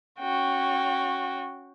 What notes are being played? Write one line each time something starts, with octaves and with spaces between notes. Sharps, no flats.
C#4 F#4 G5